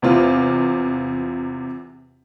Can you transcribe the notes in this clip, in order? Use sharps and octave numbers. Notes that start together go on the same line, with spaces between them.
E2 C3 F4